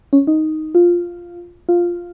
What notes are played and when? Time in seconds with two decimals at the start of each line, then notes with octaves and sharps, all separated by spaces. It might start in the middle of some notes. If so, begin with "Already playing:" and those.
0.13 C#4
0.27 D#4
0.75 F4
1.69 F4